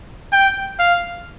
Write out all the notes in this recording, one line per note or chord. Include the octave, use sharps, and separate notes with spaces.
G5
F5